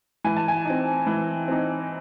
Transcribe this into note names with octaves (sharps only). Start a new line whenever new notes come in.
E3 G#5
A5
G#5
C4 D#4
E3
C4 D#4